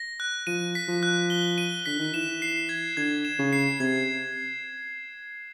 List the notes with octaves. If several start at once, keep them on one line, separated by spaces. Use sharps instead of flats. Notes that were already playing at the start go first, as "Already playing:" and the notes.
Already playing: A#6
F#6
F3 D#7
B6
F3
F#6
G7
D#7
D3 B6
D#3
E3 E7
C7
G#6
D3 G#6
E7
C#3
C7
C3 G#6